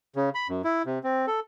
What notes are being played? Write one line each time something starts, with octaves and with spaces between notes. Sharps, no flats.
C#3
B5
F#2
E4
C3
C4
A4